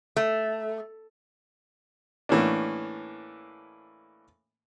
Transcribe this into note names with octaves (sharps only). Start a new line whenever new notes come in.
A3
A2 E3 A#3 C#4 D4